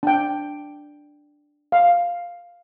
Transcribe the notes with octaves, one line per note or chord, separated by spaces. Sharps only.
D4 G5
F5